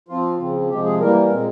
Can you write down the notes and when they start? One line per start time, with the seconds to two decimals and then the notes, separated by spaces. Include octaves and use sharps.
0.08 F3 C4 F4
0.39 C#3 F3 C4
0.69 C3 F3 G#3 G4
0.84 G#4
0.99 E3 G3 A#3 A#4
1.30 A#2 G#3 C4